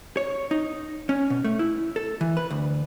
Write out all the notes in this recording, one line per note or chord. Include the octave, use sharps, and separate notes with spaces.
C#5
D#4
C#4
B2
A3
E4
A4
E3
B4
D2